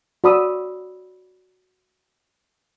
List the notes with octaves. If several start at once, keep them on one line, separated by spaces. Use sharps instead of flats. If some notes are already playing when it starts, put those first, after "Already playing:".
F#4 D5 B5 D#6 E6